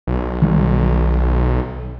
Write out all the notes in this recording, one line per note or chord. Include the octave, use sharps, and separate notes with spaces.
B1
D#3 G3